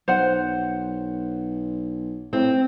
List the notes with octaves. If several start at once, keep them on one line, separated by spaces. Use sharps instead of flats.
B1 C5 F#5
A2 C4